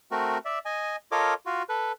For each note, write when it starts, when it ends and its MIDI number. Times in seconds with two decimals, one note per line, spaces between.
0.11 0.38 57
0.11 0.38 60
0.11 0.38 66
0.11 0.38 70
0.45 0.59 74
0.45 0.59 76
0.65 0.96 75
0.65 0.96 80
1.12 1.34 65
1.12 1.34 69
1.12 1.34 70
1.12 1.34 73
1.12 1.34 75
1.12 1.34 86
1.46 1.63 65
1.46 1.63 66
1.69 1.92 69
1.69 1.92 71